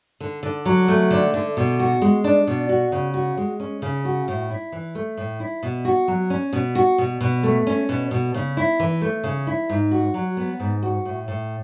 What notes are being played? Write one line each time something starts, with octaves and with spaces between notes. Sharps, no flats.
D3
D3
F#3
A3
D3
D3
B2
F#4
G#3
D4
B2
F#4
C#3
F#4
G#3
C#4
C#3
F#4
A2
E4
E3
A3
A2
E4
B2
F#4
F#3
C#4
B2
F#4
B2
B2
A3
C#4
B2
B2
C#3
E4
E3
A3
C#3
E4
G#2
F#4
F#3
B3
G#2
F#4
A2
A2